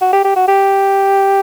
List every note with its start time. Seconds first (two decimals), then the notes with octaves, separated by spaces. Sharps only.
0.01 F#4
0.13 G4
0.25 G4
0.36 F#4
0.48 G4